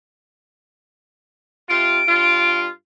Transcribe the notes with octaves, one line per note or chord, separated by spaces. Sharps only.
C3 F4 D7
G2 F4